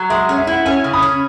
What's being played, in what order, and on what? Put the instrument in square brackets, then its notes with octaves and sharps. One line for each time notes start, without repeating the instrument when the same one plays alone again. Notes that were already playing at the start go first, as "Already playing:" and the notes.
Already playing: [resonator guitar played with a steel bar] F#3
[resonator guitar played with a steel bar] G#3 [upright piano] E5
[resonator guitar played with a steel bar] C#4
[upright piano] E5
[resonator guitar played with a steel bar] E4 [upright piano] F#5
[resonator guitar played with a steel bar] C#4 [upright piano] E5 G#5
[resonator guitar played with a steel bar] C#3
[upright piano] B5 D#6
[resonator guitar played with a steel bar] C#4